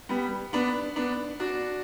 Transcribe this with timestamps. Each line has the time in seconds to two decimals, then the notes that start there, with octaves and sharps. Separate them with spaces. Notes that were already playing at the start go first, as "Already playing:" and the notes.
0.09 G3 B3
0.53 B3 D4
0.96 B3 D4
1.40 D4 F#4